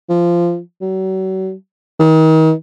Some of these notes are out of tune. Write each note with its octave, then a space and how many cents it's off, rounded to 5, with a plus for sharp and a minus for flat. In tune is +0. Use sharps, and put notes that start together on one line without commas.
F3 -15
F#3 +40
D#3 +35